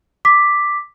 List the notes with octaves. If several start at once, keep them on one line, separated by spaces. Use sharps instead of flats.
D6 B6